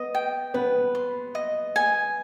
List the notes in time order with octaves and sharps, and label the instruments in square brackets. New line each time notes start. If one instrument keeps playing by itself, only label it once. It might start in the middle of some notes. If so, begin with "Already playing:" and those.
Already playing: [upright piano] B3 [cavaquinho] D#5
[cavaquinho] G5
[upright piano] B3 [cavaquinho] B4
[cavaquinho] C6
D#5
G#5